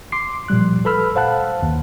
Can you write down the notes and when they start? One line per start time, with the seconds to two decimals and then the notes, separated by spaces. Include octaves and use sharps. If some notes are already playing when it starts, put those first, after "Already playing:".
0.12 C6 D6 C7
0.48 A#2 F3 G3 F#6
0.85 A4 B4 B5 E6 F6
1.16 C5 F5 F#5 A5 F#6
1.63 D#2